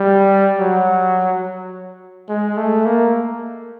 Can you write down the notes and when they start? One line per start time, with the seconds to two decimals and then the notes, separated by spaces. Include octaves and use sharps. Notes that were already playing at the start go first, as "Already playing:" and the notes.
Already playing: G3
0.59 F#3
2.29 G#3
2.57 A3
2.85 A#3